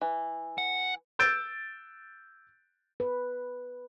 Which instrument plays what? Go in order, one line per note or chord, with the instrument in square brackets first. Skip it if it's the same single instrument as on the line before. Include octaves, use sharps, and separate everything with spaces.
[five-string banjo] E3
[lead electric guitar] F#5
[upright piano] E6 G6 A6 D7
[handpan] B4